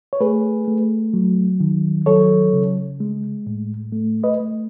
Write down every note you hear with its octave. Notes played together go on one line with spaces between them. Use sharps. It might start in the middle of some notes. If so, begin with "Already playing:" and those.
C#5
A3 G#4 B4
A3
F#3
D#3
F#3 A4 C#5
C#3
G#3
A2
A3
B4 D#5
A3